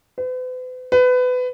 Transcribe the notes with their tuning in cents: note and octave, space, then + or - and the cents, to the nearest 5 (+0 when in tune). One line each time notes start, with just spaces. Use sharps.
B4 +45
B4 +25